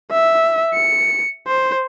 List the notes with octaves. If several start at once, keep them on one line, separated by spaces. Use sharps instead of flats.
E5
C#7
C5